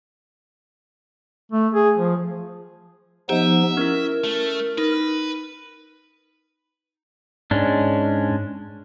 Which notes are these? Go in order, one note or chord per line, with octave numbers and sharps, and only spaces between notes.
A3
G#4
F3
F3 B3 D#4 G4 D#5 E5
C#4 E4 A#4
A3
D#4 B4
G#2 G#3 C#4 D4